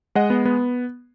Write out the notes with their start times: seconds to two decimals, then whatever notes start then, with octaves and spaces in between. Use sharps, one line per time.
0.15 G#3 D#5 F#5
0.30 B3
0.45 B3